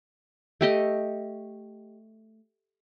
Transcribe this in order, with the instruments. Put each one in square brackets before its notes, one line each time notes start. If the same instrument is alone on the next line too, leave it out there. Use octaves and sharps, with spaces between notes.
[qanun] A3 G4 D#5